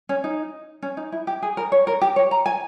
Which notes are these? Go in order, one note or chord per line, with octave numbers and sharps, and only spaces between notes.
C#4
D#4
C#4
D#4
E4
G4
G#4
A#4
C#5
A#4
G4
C#5
A#5
G#5